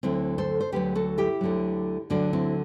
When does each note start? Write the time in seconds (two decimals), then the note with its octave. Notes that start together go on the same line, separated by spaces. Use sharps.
0.03 D2 D3 F#3 C4 E4
0.38 A4 C5
0.61 C5
0.72 D2 D3 F#3 G4 B4
0.95 F#4 A4
1.18 E4 G4
1.41 D2 D3 F#3
2.10 D2 D3 F#3 D4 F#4
2.33 C4 E4